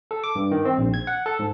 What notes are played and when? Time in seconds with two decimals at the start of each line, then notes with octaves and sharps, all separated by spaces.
0.11 A4
0.24 D6
0.36 G2
0.51 D#3
0.65 C4
0.78 A#1
0.94 G#6
1.07 F#5
1.26 A4
1.39 G#2